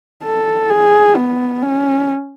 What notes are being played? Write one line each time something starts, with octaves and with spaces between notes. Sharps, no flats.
A4
G#4
B3
C#4